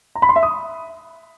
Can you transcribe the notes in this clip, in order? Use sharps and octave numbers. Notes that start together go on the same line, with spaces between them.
A#5
B5
C6
E5
D#6